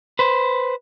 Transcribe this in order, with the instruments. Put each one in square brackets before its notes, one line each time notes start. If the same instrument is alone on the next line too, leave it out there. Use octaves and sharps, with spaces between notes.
[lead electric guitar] B4 C5